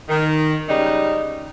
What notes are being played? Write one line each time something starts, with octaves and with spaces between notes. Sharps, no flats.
D#3
C#3 G3 G#3 D#4